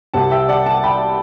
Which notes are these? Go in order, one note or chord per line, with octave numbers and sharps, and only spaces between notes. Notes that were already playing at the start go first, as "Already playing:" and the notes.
C2 C3 G3 C4 F#5 A5
E5 G5
D5 F#5
F#5 A5
G5 B5